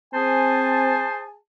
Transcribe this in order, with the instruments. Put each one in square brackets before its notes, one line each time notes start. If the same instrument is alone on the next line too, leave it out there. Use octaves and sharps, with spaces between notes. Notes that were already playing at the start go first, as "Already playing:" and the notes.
[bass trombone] C4 [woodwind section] G#4 G#5 A5 [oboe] C5